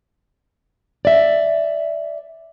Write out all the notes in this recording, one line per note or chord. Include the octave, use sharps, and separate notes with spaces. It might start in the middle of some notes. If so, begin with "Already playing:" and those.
D5 E5